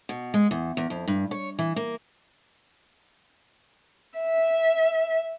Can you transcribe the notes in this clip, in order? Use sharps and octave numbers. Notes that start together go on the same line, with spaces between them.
B2
G#3
E2
E2
F2
G2
C#5
E3
A#3
E5